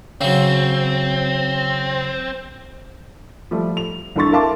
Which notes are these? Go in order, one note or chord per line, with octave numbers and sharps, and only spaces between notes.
C#3 F#3 C4
F3 G3 A3
F7
C2 G2 A4 C6 C#6 A6
A#4 E5 F5 A5 C6 D6